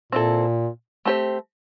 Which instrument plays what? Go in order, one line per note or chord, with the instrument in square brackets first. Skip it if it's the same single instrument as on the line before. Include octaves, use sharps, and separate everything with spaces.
[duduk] A#2 [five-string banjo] C4 E4 A4
[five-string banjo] A3 C4 G4 C5